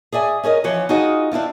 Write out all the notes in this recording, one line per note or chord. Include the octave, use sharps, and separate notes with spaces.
G#4 D5 E5 G#5
C#4 G#4 A#4 D#5
E3 F3 C#4 C#5
D#4 F4 F#4 G#4 D#5
C4 D4 E4 F4